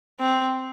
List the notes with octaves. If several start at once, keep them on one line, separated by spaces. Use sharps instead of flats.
C4